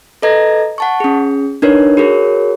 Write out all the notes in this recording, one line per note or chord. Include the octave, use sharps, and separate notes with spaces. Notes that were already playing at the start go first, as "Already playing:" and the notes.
A4 B4 D#5 A#5 G#6 A#6
F#5 A5 C#6
C#4 G#4
D4 D#4 A#4 B4 C#5
F#4 G#4 A#4 C#5